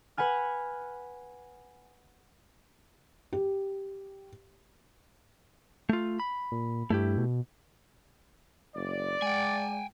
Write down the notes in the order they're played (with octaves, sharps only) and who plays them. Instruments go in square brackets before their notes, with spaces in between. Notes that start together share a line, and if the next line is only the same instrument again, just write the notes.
[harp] B4 F#5 G#5 F6
[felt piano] G4
[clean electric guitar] A3 F4
B5
[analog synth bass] A#2
[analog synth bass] G2 [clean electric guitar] A3 E4 G4
[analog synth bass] B2
[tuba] F#1 [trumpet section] D5
[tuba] G#3 [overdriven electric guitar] G5 G#5